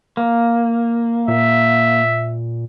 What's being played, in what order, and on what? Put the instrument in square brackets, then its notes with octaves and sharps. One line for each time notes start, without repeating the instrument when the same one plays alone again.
[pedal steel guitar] A#3
[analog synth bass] A#2 [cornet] E5